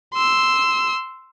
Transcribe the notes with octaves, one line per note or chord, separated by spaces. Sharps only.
C6 E6